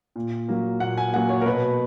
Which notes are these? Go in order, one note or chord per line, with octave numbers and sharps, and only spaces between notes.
A#2
F#3 A#3
A#2 F#5
G#5
F#3 A#3 F#5
C#5
A#4
B2 B4